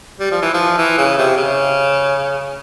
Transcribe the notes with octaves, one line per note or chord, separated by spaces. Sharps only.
G3
F3
E3
F3
E3
C#3
C3
C#3